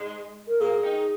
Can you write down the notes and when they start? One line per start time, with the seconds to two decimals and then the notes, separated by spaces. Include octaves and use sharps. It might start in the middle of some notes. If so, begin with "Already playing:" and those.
Already playing: G#2 G#3
0.47 A#4
0.61 A#2 A#3 G#4
0.83 D#3 D#4